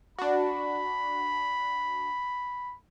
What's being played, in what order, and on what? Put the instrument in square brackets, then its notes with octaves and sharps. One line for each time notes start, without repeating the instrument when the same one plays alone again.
[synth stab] D4 F#4 [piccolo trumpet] B5